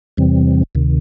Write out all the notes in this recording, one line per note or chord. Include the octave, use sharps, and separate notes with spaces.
E2 C3 E3 G3 C4
D2 C3 D#3